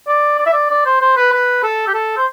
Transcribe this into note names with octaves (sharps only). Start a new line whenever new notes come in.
D5
D5
E5
D5
D5
C5
C5
B4
B4
A4
G4
A4
C5